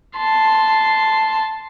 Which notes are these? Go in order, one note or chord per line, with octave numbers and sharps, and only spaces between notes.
A5 C6